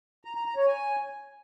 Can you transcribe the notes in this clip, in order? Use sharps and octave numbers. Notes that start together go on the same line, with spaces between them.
A#5
A#5
A#5
C#5
G#5